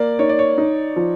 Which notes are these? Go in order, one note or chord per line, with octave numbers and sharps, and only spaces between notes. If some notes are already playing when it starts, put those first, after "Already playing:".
Already playing: A#3 D5
D#4 C#5
D5
C#5
D#4
F3